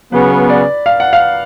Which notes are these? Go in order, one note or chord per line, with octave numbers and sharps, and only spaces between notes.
C#3 F#3 B3 B4
D5
F5
F#5
F5